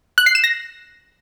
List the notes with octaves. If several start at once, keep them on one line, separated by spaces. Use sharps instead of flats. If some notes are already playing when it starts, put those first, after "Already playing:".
F#6
C7
E7
A#6